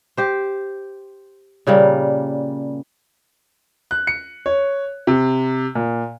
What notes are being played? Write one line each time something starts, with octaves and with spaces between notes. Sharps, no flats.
G4 C5
A#2 C#3 G3 A#3
F#6
C#7
C#5
C3
A#2